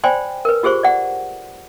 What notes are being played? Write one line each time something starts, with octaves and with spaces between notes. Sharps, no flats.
C5 D5 G5 G#5 B5 C6
A#4 B4
F4 G4 G#4 C5 C#6
D5 F#5